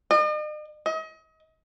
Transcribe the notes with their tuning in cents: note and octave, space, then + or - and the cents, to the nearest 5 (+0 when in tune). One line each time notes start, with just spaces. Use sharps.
D#5 -45
D#5 +35